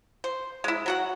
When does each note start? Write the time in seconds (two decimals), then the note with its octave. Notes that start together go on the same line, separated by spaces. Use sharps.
0.24 C5
0.64 G#3 E4
0.86 F#3 F#4 F#5